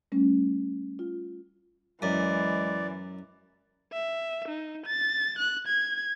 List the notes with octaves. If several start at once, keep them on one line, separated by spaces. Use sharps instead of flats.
G3 A3 C#4
F4
F#2 E3 G#3 D5
E5
D#4
A6
F#6
G#6